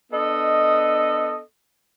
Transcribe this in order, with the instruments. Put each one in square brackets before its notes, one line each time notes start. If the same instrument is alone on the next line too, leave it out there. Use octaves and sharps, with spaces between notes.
[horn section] B3 D4 A4 D#5